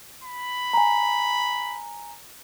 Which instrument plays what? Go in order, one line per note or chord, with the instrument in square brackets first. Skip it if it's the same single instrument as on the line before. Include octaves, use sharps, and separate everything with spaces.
[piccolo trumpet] B5
[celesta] G#5 A#5